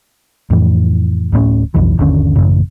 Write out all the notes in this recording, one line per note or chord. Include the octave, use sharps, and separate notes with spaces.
F2 A2 E3
D1 A2 B3 C#4
B1 F2 E3
G1 D#2 D3 C#4
A1 F#2 C#3